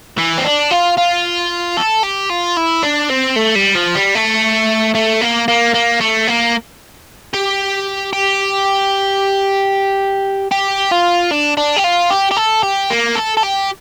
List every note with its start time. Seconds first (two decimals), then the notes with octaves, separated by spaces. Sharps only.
0.18 E3
0.38 C4
0.44 D4
0.71 F4
0.97 F4
1.77 A4
2.03 G4
2.29 F4
2.57 E4
2.83 D4
3.09 C4
3.36 A3
3.55 G3
3.75 F3
3.95 G3
4.15 A3
4.95 A3
5.21 A#3
5.48 A#3
5.74 A#3
6.01 A3
6.27 A#3
7.34 G4
8.13 G4
10.52 G4
10.92 F4
11.31 D4
11.57 D4
11.76 G4
11.84 F4
12.11 G4
12.32 G4
12.37 A4
12.63 G4
12.90 A#3
13.16 A4
13.37 A4
13.43 G4